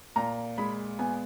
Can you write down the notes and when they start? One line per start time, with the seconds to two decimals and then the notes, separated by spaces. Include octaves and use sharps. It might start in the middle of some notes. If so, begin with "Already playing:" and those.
0.16 A#2 A#5
0.58 G#3 B5
0.99 B3 G#5